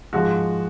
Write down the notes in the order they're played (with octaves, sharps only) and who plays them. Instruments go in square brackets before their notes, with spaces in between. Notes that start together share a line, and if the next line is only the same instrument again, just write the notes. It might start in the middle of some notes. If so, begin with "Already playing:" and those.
[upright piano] G#2 F3 G#3 F#4